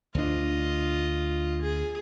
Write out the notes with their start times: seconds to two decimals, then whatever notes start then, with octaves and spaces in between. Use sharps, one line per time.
0.15 D2 D4 F4 D#5
1.62 G#4